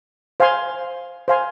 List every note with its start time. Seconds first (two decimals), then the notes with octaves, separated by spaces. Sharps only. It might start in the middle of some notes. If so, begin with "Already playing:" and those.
0.40 C5 F5 G#5 C6
1.28 C5 F5 G#5 C6